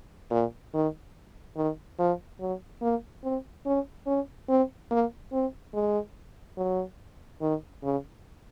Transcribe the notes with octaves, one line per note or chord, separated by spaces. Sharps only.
A#2
D#3
D#3
F3
F#3
A#3
C4
C#4
C#4
C4
A#3
C4
G#3
F#3
D#3
C#3